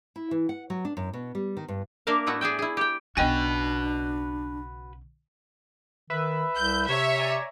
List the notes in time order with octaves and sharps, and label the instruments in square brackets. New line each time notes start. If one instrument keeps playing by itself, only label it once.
[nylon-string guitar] E4
E3
F#5
F#3
D4
F#2
B2
G3
D#3
G2
[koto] A#3 D4 A#4 E5 F5
A2 A3 B3 E4 F#4
G#4 D5 E5 G5
E4 G#4
G4 G5
[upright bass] B1 C#3 [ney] D4 [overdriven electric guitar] F#4 B4 [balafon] D#5 G5 G#5
[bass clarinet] D#3 [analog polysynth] B4 E5
[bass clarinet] C2 [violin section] G6
[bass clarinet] C3 [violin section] C#5 E5
[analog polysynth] D5 G#5 A#5